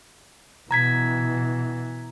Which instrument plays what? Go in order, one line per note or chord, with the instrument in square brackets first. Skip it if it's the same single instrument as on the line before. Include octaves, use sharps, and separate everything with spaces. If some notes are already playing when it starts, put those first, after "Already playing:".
[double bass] B2 E3 [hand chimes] A#5 G#6 B6